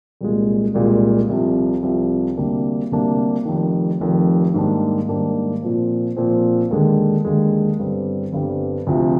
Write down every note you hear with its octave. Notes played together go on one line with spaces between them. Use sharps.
C2 A#2 G#3
C2 A#2 G#3
C2 C3 F3
C2 C3 F3
D2 C3 G3 A#3 D4
D2 C3 G3 A#3 D4
F1 F2 D#3
F1 F2 D#3
G#2 D#3 G3 A#3 D4
G#2 D#3 G3 A#3 D4
A#2 F3 C4
A#2 F3 C4
D#2 D3 G#3
D#2 D3 G#3
G1 G2 D3 G3 C4
G1 G2 D3 G3 C4
D2 C3 F3